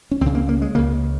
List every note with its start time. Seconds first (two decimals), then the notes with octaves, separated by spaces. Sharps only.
0.11 C#4
0.21 C#2 C4
0.26 C#3
0.35 A#3
0.49 A#3
0.62 G#3
0.75 C#2 C#3 A#3